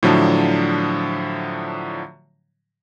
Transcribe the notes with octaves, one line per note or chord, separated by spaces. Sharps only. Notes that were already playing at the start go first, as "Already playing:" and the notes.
A2 D3 F3 F#3 D4